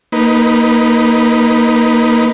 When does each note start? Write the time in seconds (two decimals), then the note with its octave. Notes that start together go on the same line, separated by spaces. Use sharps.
0.12 A#3 D#4 B4